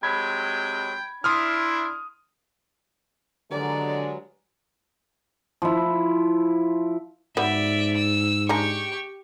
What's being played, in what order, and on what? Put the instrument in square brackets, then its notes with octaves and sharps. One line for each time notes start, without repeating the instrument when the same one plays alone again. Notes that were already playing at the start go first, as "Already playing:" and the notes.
[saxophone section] C3 F#3 G#3 [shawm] G5 [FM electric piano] B5 G#6
[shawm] D4 [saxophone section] E4 [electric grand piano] C6 D#6 F6
[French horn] D3 [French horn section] F#3 G#3 [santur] G4 A#4 B4 [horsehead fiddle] D5
[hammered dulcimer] F3 E4
[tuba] G#2 [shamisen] F#3 G3 B3 [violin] D5 E5
[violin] E6
[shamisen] G#3 D4 A#5 [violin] G4 C#6